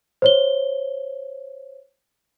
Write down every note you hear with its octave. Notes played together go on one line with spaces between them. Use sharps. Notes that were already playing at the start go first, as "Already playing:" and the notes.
C5 C#5 G7